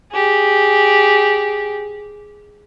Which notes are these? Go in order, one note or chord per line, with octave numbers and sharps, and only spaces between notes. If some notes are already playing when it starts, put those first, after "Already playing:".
G4 G#4